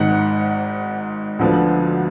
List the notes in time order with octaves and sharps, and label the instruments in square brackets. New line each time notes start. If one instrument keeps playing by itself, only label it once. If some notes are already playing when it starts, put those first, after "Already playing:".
Already playing: [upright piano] G#1 G#2 D#3 F#5
D2 D3 F3 B3